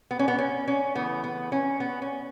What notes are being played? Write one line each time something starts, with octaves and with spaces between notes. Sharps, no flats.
B3
C#4
B3
C#4
C#4
C#3 E3 A3 B3
B3
C#4
B3
C#4